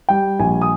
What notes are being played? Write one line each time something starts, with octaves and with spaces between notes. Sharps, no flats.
G3 G5
A#1 G#5
D#6